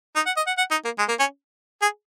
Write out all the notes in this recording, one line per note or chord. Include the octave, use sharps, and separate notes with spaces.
D#4
F#5
D#5
F#5
F#5
D#4
A#3
G#3
A#3
C#4
G#4